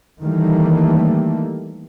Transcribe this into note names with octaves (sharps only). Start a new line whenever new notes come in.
D#3 E3 G3 A3 A#3